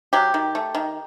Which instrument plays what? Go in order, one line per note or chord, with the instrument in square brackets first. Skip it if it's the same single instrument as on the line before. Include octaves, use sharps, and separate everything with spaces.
[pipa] F#3 G4
D#3
A3
D#3